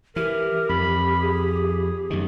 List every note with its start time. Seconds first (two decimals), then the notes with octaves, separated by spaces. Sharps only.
0.16 E3 G4 A#4
0.69 F2 B5
1.22 G#4
2.10 F#2 D#3